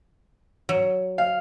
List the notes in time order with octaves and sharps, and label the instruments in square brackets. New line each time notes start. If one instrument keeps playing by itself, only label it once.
[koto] F#3
[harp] F5